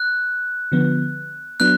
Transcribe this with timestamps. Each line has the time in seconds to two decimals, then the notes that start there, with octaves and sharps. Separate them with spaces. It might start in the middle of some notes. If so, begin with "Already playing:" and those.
Already playing: F#6
0.72 D3 F3 B3
1.60 F#3 B3 D4 F#6